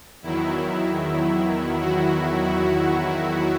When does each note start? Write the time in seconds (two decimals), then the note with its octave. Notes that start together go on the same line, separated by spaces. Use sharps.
0.23 E2 D#3 F#3 E4
1.81 F#4